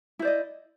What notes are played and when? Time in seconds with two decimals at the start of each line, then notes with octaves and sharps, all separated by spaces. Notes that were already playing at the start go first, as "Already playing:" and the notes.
0.19 E4
0.22 C5
0.25 D5
0.27 D#5